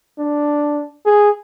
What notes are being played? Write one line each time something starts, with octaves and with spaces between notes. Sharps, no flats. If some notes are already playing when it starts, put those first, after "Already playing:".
D4
G#4